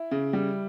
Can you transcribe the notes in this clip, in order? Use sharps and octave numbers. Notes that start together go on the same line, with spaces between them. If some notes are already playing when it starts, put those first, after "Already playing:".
Already playing: E4
C#3
G3